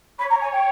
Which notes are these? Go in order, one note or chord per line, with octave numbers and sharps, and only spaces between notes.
C#5 B5
A#5
G#5
G5